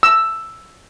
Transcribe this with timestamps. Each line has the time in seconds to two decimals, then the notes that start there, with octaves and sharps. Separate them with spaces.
0.03 E6